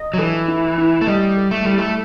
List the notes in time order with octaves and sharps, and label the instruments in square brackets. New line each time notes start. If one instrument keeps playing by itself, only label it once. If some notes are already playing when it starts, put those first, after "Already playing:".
Already playing: [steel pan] D#5
[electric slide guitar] F#3
[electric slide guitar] E3 [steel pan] A4
[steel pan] E4
E4
[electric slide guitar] A3
[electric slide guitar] G3 [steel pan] D#5
[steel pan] A4
[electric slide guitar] A3
[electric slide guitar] G3 [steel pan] E4
[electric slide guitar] A3